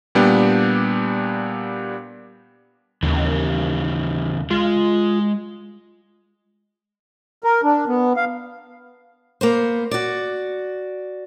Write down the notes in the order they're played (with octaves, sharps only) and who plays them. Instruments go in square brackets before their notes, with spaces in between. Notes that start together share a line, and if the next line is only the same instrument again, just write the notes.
[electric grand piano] A#2 G3 B3 D4 G4
[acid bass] D#2 [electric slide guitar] C#3 E3
[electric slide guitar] G#3 [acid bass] F4
[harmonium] A#4
D4
B3
F5
[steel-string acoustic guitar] A#3 B3 C5
F#4 D5